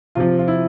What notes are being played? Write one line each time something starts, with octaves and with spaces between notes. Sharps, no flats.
C3 F3 F4
F4
E4